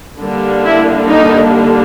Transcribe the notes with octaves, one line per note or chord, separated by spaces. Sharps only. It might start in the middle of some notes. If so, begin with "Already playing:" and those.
D3 G3 A#3 D4
E4
D#4